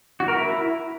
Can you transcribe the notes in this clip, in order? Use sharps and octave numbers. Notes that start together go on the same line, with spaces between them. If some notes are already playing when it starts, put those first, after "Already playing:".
F#4
A#4
E4